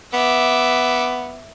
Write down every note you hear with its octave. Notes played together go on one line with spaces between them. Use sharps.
B3 E5 D6